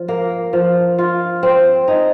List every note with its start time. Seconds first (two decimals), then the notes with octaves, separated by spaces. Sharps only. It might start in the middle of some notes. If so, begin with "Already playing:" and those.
Already playing: F3
0.08 A#3
0.53 F3
0.98 F4
1.43 C4
1.88 D#4